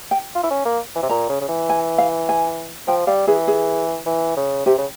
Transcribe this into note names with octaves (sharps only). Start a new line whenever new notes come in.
G5
F4
E4
C#4
A#3
E3
C3
A#2 A#5
C#3
C#3
E3
G#5
F5
G#5
F3 G5
G3 F5
E3 G#4
G#4
E3
C#3
C3 G4
C#3